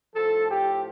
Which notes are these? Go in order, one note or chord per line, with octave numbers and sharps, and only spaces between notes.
A2 F3 A4
G4